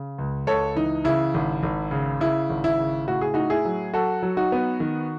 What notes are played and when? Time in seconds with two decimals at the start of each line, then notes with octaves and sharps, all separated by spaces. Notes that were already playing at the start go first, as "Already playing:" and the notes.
Already playing: C#3
0.18 C#2
0.47 C#2 A4 C#5
0.76 E3 D#4
1.04 C#3 E4
1.34 G#1
1.63 G#1
1.91 C#3
2.20 C#3 E4
2.50 G#1
2.64 E4
2.78 C#3
3.07 A2 F#4
3.21 G#4
3.34 A2 D#4 F#4
3.50 E4 G#4
3.65 F#3
3.94 F#3 F#4 A4
4.22 F#3
4.37 D#4 F#4
4.52 B3
4.80 D#3